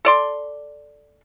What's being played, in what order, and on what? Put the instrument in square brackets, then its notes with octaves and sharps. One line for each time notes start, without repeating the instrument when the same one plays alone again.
[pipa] A4 D5 C6